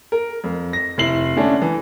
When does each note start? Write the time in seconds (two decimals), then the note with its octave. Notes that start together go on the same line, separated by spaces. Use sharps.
0.12 A#4
0.44 F2
0.73 A#6
0.98 F1 E4 C7 F#7
1.36 D3 A3 C#4 D4
1.62 E3